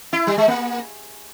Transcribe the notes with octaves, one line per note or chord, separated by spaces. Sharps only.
E4
G3
G#3
A#3